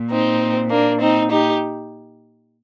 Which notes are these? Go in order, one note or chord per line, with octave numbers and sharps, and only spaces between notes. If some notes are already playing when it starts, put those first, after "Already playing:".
Already playing: A#2
C4 D#4
A#3 D4
C4 D#4
D#4 G4